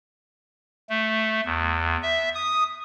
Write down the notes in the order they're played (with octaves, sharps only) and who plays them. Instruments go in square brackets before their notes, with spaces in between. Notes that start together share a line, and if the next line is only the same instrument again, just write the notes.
[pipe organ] A3
E2
E5
D#6